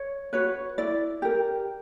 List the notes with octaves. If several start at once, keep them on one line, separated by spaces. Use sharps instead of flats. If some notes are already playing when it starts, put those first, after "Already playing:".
Already playing: C#5
F#4 B4 C#5
E4 D5
G4 A#4